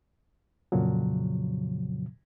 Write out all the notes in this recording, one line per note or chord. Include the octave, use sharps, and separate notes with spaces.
F2 A#2 C#3 F3 F#3